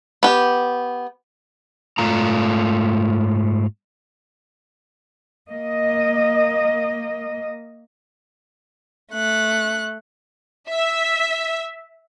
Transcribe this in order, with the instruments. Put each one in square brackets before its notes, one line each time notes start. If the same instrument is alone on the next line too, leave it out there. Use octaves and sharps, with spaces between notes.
[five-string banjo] B3 G4
[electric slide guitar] G#2 A3 F4 A#5
[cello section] A#3 D#5
[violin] A3 F#6
[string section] E5